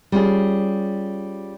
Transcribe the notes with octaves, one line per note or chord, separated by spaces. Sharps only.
G3 C#4 F4 G#4